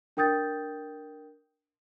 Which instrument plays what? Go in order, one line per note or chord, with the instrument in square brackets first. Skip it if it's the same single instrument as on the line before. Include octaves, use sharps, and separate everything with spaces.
[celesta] D4 A#4 G5 D#6 G6 A6